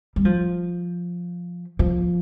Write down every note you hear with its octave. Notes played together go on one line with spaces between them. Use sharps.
G3
F3
F3